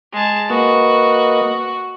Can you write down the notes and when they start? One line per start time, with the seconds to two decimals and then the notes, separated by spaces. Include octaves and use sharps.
0.13 G#3 A5
0.50 A#3 F#4 B4 D#5